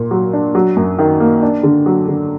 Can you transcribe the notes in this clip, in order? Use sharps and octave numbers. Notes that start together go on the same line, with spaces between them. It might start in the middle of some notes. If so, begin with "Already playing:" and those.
Already playing: A#2 A#3
F#3
D4
F#3
F#2
D#3
A#3
D4
D3
F#3
D3